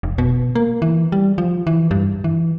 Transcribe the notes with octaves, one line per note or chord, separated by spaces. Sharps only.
F1
B2
A#3
E3
G3
F3
E3
G2
E3